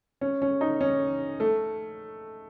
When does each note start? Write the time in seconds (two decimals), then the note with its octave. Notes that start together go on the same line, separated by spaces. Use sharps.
0.21 C#4
0.42 C#4
0.61 D#4
0.81 C#4
1.40 A3